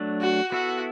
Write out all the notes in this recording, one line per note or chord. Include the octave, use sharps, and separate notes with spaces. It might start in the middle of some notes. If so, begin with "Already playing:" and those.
Already playing: F#3 A3 D4
F#4
B3 E4 F#4 A4 E5